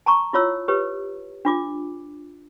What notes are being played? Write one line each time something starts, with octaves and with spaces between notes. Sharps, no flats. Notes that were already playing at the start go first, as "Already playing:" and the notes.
A5 A#5 C#6
E4 F4 C#5 E6
G4 B4 C#5
D4 F4 D6